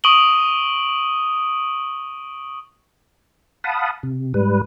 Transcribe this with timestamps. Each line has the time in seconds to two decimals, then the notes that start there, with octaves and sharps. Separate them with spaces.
0.04 C#6 D#6 D7 D#7 F#7 G7
3.64 F5 F#5 A5 B5 D#6
4.03 C3
4.34 G#2 G3 B4